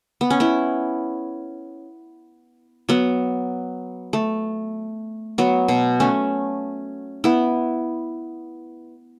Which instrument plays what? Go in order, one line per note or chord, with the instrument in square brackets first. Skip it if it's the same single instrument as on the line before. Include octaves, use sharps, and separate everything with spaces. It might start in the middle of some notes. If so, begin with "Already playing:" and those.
[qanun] B3
C#4
B3 E4
F#3 B3
A3
F#3 B3
B2
A3 C#4
B3 E4